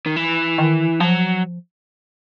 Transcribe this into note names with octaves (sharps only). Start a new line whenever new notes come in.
D#3
E3
D#3
F3 F#3